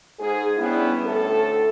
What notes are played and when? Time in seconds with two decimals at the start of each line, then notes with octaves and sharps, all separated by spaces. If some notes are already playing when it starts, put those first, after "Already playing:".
0.20 G#2 G#4
0.57 G3 B3 C#4 D4 E4
1.06 D2 A2 A3 A4